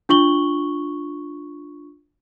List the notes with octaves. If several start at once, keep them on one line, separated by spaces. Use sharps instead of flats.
D4 F4 C#6 F#7 G7